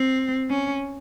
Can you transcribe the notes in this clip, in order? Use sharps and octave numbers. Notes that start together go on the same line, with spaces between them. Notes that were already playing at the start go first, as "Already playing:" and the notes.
Already playing: C4
C#4